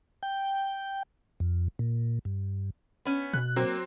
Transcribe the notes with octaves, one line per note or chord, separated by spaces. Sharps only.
G5
F2
A#2
G2
B3 C#4
B2 F#6
F#3 A#3 C4